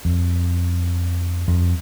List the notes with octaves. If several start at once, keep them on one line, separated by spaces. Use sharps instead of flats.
F2
F2